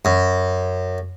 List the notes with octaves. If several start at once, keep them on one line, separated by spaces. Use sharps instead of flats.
F#2